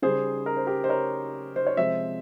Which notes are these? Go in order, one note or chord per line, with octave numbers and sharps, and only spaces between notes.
C#3 G3 G#4 C5
A#4
C5
G4 A#4
C5
A#4 C#5
C5
C#5
C3 F3 G#3 C5 E5